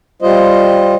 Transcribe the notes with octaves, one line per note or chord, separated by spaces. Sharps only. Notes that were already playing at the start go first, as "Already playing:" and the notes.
G3 F4 C5 D#5